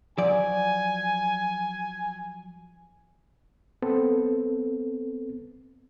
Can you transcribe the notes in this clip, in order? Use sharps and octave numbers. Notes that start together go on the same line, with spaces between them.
F3 F#3 D5 G#5
B3 C4 A4